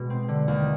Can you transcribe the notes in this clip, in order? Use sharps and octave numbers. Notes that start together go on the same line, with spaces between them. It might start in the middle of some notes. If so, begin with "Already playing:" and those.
Already playing: B2 G#3
C4
D3
D#2